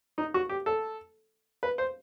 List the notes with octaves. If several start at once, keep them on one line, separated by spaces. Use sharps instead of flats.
D#4
F#4
G4
A4
B4
C5